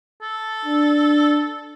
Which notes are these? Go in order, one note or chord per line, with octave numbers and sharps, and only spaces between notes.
A4
D4